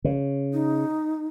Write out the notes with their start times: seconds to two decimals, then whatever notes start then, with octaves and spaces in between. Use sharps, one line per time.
0.04 C#3
0.53 D#4